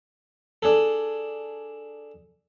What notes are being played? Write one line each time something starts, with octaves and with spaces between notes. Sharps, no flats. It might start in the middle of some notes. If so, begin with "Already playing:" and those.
D4 G#4 A4